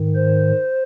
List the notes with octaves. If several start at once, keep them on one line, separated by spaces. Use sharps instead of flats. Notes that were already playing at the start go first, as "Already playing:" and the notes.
Already playing: G#2 D#3
C5